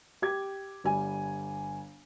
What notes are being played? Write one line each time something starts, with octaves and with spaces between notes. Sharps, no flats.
G4 G#6
G1 G3 G#5